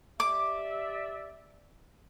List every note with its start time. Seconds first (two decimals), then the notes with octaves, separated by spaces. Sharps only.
0.20 G4 D5 E5 D6